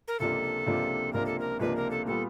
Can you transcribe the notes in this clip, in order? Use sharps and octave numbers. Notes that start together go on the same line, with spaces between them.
A#4
C#2 C3 F3 A#3 D4 A4
C#2 C3 F3 A#3 D4
C#2 C3 F3 A#3 D4 A#4
A4
A#4
C#2 C3 F3 A#3 D4 B4
A#4
A4
A#2 G3 B3 A4